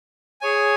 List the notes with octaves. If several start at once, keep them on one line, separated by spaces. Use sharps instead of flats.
G#4 C#5 G#5